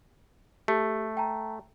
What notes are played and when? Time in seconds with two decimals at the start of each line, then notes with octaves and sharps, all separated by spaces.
0.68 A3 G4
1.17 G5 A5 A#5